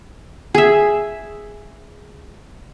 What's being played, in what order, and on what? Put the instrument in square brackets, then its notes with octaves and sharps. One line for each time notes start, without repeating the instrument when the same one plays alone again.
[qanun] G#4 E5